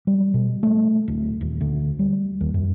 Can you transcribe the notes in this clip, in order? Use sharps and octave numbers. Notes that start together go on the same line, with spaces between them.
G3
B2
A3
D1
D#1
D2
G3
D#2
F#2